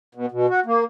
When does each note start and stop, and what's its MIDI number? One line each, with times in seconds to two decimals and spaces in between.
0.15 0.26 47
0.32 0.46 47
0.49 0.60 66
0.66 0.84 58